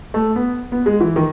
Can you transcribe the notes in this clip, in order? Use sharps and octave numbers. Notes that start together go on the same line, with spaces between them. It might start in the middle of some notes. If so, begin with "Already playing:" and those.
A3
B3
B3
G#3
E3
D#3